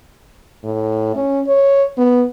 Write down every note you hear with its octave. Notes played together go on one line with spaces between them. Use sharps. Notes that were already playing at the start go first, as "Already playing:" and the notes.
A2
C#4
C#5
B3